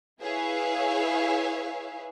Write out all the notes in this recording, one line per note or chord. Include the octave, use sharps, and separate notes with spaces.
E4 G#4 B4 C#5 E5 F5